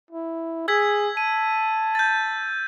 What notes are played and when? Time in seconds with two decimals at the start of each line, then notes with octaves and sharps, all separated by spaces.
0.11 E4
0.68 G#4 E6 G#6 B6
1.17 A5 D#7
1.95 G6 A6